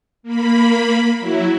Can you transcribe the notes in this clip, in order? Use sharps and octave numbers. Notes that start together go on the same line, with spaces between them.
A#3 B5
F#3 E4